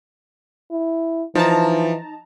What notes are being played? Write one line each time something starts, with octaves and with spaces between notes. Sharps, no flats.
E4
E3 F3 D#4 A5 A#5